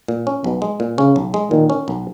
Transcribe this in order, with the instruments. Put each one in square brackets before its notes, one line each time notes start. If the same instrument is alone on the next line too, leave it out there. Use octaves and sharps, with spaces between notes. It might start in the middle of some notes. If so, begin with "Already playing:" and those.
[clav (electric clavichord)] A#2
C#4
[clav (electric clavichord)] B1 [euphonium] B2
[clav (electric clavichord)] G#3
A#2
[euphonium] C#3 [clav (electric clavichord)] C#4
[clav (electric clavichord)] B1
G#3
[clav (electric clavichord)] A#2 [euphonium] D#3
[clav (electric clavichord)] C#4
B1